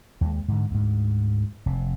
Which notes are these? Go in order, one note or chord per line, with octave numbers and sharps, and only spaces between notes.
D#2 G#3
G#2 D3
D2 G#2
F1 C3